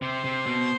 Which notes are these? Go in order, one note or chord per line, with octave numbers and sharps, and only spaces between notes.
C3 C5
C3
B2